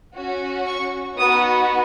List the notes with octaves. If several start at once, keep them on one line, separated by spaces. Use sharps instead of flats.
C#4 F#4
C#6
B3 D#4 F#4 D#6